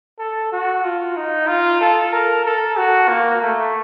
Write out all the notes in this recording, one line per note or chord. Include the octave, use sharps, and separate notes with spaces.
A4
F#4
F4
D#4
F4
A4
A#4
A4
F#4
A#3
A3